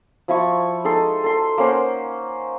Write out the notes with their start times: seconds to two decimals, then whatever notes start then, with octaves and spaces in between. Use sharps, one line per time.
0.28 F3 E4 F4 C#6
0.84 G#3 D#4 A4 C6
1.24 A4 C6
1.58 A#3 C#4 C5 F#5